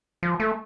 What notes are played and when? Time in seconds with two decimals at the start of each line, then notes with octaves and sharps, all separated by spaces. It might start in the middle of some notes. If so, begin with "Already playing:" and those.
0.23 F3
0.40 A3